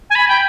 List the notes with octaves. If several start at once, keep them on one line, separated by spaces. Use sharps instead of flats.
G#5
B5
G5